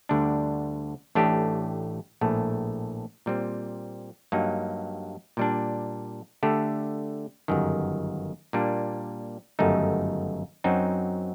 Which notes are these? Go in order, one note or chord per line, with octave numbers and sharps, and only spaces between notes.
D2 D3 G3 D4
A1 A2 A3 D4 G4
A#1 A2 A3
A#2 G3 C4
G2 F#3 A#3 D#4
A#2 G3 D4
D3 A3 D4 G4
G1 F#2 D#3
A#2 G3 A#3 D4
G1 F#2 D#3 A3 D#4
F#2 F#3 C4 D#4